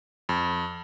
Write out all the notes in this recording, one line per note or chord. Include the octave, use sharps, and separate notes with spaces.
F2